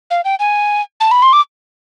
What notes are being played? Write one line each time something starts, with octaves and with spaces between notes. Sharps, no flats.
F5
G5
G#5
A5
B5
C6
D6